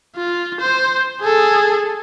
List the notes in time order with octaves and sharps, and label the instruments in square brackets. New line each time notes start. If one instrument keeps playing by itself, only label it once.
[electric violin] F4
C5
G#4 A4